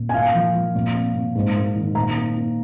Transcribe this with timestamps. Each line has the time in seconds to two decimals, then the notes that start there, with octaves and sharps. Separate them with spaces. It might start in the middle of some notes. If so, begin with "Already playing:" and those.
Already playing: A#2
0.09 G#5
0.14 A#3 F5
0.34 F3
0.54 F3
0.75 A#2
0.94 C4
1.15 A#2
1.35 G#2
1.55 A#3
1.75 D#3
1.95 A#2 A#5
2.16 A#3
2.36 A#3